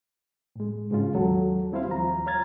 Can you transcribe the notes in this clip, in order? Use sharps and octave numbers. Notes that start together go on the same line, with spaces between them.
A2 G#3
G#2 C#3 G#3 C#4 F4
D#2 F#3 A4
G3 C4 E4 F4 C5 F5
D#2 F3 F4 A#5
C#5 A#5 F6 G#6 A6